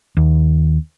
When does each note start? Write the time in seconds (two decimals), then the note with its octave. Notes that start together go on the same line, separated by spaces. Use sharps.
0.17 D#2